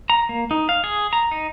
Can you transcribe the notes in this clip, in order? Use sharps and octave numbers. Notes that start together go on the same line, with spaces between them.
A#5
A#3
D#4
F5
G#4
A#5
D#4